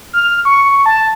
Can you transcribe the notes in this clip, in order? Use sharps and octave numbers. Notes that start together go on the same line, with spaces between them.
F6
C#6
A5